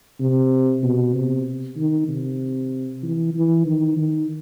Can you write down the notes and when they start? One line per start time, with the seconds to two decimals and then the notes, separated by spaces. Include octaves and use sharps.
0.20 C3
0.83 B2
1.14 C3
1.77 D#3
2.08 C3
3.03 E3
3.34 E3
3.66 D#3
3.97 D#3